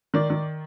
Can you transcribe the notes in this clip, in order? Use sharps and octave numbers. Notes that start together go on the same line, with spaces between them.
D#3 D5
D#3